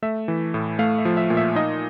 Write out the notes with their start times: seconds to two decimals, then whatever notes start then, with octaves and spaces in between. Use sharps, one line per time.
0.02 A3 E5
0.28 E3
0.54 A2
0.79 A3 F5
0.98 E5
1.05 F3
1.17 E5
1.30 A#2
1.37 E5
1.55 D#4 D#5